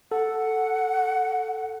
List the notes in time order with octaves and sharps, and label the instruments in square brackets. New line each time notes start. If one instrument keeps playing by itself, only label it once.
[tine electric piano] A4 [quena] F#5